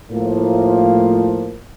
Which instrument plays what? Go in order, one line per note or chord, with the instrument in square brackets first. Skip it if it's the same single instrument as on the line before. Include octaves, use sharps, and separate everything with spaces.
[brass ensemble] A2 F3 A#3 F4